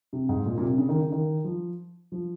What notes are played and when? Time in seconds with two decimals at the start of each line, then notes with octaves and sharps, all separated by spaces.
0.13 C3
0.29 G#2
0.46 A#2
0.58 A#2
0.62 C3
0.78 C#3
0.89 D#3
0.98 C#3
1.12 D#3
1.44 F3
2.12 F3